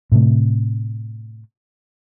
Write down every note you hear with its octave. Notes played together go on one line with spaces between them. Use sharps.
A2 C3 A3